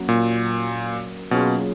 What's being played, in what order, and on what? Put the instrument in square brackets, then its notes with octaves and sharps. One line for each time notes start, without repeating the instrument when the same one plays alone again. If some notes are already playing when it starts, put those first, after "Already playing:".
Already playing: [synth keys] F#3 A#3 C#4 F#4 A#4
[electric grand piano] A#2
[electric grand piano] B2 [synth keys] F#3 A#3 C#4 F4 G#4